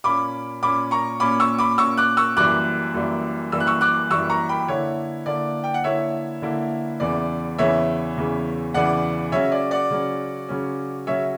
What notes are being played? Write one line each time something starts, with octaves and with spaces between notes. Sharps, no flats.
A#2 A#3 C#4 B5 D6
A#2 A#3 C#4 B5 D6
A#5 C#6
A#2 A#3 C#4 B5 D6
C#6 E6
B5 D6
A#2 A#3 C#4 C#6 E6
D6 F#6
C#6 E6
F#2 E3 G3 A#3 D6 F#6
F#2 E3 G3 A#3
F#2 E3 G3 A#3 E6
F#6
C#6 E6
D6 F#6
F#2 E3 G3 A#3 C#6 E6
A#5 C#6
G5 B5
D3 A#3 E4 C#5
D3 A#3 E4 D5
G5
F#5
D3 A#3 E4 C#5 E5
D3 A#3 E4
E2 C#3 E3 D5
E2 C#3 E3 C#5 E5
E2 C#3 E3
E2 C#3 E3 D5 F#5
C#3 F#3 C#4 C#5 E5
D5
D5 F#5
C#3 F#3 C#4
C#3 F#3 C#4
C#3 F#3 C#4 C#5 E5